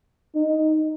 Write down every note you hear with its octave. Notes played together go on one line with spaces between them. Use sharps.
D#4